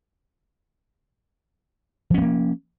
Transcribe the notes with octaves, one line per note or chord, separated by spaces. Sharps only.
F3 A#3 B3 C#4